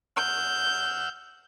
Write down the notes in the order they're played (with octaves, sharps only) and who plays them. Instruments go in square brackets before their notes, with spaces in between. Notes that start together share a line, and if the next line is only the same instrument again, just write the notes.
[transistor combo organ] F#5 E6 F6 [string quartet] G6